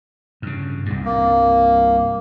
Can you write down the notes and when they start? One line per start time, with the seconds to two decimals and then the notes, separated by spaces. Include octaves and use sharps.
0.42 G2 C#3
0.86 C2 G2
1.05 A#3